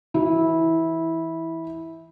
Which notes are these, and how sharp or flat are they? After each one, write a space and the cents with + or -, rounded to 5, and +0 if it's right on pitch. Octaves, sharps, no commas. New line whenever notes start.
E3 +0 E4 -15